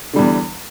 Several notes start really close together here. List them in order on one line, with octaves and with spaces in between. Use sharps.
D3 G3 E2